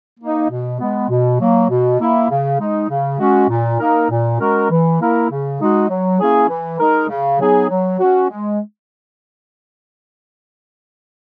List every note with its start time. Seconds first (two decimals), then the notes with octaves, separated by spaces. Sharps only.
0.19 A#3 D#4
0.50 B2
0.80 G#3 B3
1.10 B2
1.39 F#3 A#3
1.70 B2
2.00 A#3 E4
2.30 C#3
2.59 G#3 D#4
2.90 C#3
3.19 G#3 C#4 F#4
3.49 A#2
3.80 A#3 D#4 A#4
4.10 A#2
4.39 G#3 C#4 F#4 A#4
4.70 E3
5.00 A#3 E4 A#4
5.30 C#3
5.60 G#3 D#4 F#4
5.89 F#3
6.20 A#3 C#4 E4 G#4
6.49 E3
6.79 G#3 D#4 A#4
7.09 C#3
7.40 F#3 B3 D#4 G#4
7.70 F#3
7.99 C#4 F#4
8.30 G#3